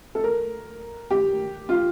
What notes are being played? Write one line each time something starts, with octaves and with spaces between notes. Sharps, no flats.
A4
A#4
G4
F4